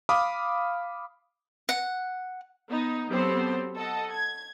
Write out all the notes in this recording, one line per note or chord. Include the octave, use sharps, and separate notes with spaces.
F5 B5 D6 D#6 F6
F#5
B3 D#4
F#3 B3 C4 G4 A4 C5
A4 D#5 F#5
G#6